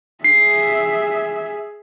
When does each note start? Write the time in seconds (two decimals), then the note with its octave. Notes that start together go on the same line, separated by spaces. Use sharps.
0.24 G#4 E5 C7